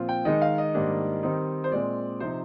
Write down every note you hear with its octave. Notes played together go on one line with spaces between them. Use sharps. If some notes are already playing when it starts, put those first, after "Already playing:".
Already playing: A#2 F3 C4 F4
G5
D#3 G#3 D#4 D#5
F5
D#5
G#2 D#3 G3 A#3 D4
D#3 G3 C4 D#4
C5
A#2 G#3 C4 D5
C3 F3 C4 D#4 C5